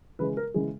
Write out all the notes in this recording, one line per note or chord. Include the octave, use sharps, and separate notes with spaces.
C#3 E3 G#3 B4
A#4
C#3 E3 G#3 G#4